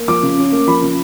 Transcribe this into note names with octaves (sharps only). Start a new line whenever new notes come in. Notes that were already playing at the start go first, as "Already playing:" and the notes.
Already playing: A#3
F3 D6
C#3
C#4
A#3
F3 B5
C#3